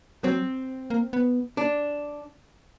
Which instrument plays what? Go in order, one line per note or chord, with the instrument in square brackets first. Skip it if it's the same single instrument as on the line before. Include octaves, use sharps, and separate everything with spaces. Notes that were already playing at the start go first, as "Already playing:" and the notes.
[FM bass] F#3 [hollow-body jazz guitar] C4
[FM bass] A#3
B3
[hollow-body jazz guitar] D4